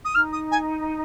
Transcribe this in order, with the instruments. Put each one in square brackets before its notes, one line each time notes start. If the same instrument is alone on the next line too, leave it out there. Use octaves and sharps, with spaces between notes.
[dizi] D#6
[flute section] D#4 [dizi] F6
[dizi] D#6
G#5